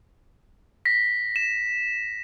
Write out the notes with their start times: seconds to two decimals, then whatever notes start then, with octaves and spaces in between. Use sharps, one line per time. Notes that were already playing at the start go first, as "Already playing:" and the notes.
0.85 A#6 B6
1.36 E7